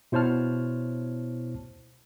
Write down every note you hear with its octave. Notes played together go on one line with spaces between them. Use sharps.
B2 E4 C5 C#5 A5 F6